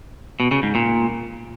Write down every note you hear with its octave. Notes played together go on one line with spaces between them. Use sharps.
B2
C#3
G#2
A#2